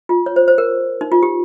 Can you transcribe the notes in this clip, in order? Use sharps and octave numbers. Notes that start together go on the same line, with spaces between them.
F4
C#5
C5
C5
A#4
D#4
F4
G4